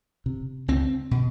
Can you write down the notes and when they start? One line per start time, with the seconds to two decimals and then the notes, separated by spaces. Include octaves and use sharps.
0.26 C3
0.68 C#2 C4
1.11 B2